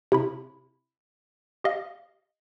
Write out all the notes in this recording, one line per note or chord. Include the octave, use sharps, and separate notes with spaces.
C3 E4 B5
G4 D#5 F5